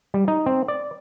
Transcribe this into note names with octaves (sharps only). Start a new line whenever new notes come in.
G3
D#4
C4
D5